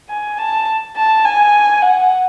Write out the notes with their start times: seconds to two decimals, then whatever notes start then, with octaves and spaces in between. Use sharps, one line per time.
0.10 G#5
0.38 A5
0.96 A5
1.25 G#5
1.82 F#5